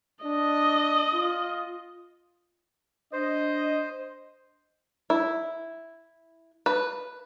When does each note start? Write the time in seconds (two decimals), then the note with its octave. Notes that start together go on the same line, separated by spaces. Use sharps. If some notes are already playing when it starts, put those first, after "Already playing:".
0.24 D4 D#5
1.13 F4
3.13 D4 C5 D#5
5.10 E4
6.66 B4